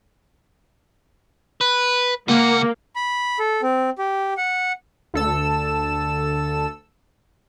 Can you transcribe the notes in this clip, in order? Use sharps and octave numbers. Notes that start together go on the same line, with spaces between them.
B4
C#2 A#3 F#5
B5
A4
C4
G4
F#5
D2 A4 E6